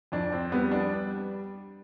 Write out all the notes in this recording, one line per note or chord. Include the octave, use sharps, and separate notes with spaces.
F2 D4
C4
G3 B3
D4